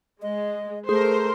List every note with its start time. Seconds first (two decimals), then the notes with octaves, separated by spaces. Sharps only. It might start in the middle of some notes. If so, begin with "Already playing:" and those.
0.22 G#3 D#5
0.89 A3 G#4 A#4 C5